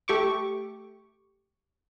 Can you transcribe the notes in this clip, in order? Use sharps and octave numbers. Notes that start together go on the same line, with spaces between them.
A3 G4 C#6 D6